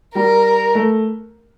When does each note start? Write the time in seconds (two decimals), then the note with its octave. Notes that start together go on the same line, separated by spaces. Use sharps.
0.15 G3 A#4
0.75 A3